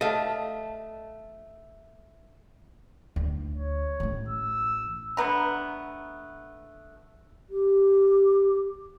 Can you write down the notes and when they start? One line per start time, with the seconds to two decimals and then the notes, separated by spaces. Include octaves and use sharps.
0.01 A3 D#5 F5
3.16 D2
3.57 C#5
4.00 A1 C#4
4.29 E6
5.17 D3 A3 B3 A#5
7.50 G4